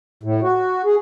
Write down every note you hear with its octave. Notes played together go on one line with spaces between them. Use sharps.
A2
F#4
G#4